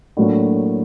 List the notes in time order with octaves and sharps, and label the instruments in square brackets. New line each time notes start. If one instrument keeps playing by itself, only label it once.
[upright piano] A2 F#3 A#3 D4